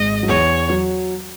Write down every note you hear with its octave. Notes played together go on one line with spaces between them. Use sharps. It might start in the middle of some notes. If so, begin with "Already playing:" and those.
Already playing: G#1 G#2 D#5
F#3
E2 E3 C#5
F#3